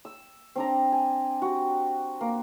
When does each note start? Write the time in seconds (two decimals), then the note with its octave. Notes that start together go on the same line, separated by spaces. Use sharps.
0.05 E6
0.56 C4 D4 A#5
0.92 G#5
1.42 F#4 G4
2.21 A#3